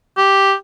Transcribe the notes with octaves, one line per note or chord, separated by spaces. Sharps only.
G4